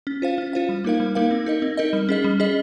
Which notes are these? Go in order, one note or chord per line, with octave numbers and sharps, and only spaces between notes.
C#4
F4 C5 F5
C#4
F4 C5 F5
G3
A#3 D#4 A#4 F5
G3
A#3 D#4 A#4 F5
C4
D#4 A#4 D#5
C4
D#4 A#4 D#5
G3
C#4 G#4 D#5
G3
C#4 G#4 D#5